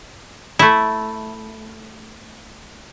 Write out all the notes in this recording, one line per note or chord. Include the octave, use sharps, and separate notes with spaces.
A3 E4